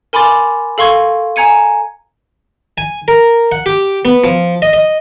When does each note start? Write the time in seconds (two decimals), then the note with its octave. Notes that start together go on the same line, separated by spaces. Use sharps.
0.13 A#4 G#5 B5 C6 D6 A6
0.78 A4 F5 C6 C#6 G#6
1.36 G#5 A#5 G#6 C#7 D#7
2.78 G#5
3.08 A#4
3.52 F#5
3.66 G4
4.05 B3
4.24 F3
4.62 D#5
4.73 D#5